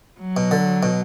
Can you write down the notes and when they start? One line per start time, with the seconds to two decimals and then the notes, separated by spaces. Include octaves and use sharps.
0.20 F#3
0.37 B2
0.51 D3
0.83 B2